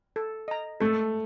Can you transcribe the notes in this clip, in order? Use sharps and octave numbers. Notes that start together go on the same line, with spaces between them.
A4
D#5 A#5
A3 A4